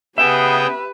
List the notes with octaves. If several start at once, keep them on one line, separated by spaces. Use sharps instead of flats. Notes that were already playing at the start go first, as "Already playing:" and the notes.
C#3 B3 G4 G#4 B4 E5 G5